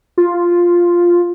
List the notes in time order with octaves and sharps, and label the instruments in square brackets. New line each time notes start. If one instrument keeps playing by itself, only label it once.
[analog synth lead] F4